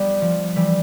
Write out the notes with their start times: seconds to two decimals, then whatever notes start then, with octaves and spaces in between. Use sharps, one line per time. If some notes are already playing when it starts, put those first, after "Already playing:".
Already playing: G3 B3
0.21 F3
0.56 E3 G3